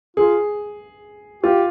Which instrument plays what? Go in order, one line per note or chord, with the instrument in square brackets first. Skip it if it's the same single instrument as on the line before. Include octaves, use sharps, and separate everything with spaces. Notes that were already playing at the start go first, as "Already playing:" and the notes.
[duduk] F4 [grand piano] G#4
[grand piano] F4 [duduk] G4